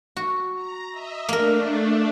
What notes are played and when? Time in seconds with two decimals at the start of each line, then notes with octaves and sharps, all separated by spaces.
0.17 F#4
0.54 A#5
0.91 D#5 E5
1.29 A3 A#3 D4 A#4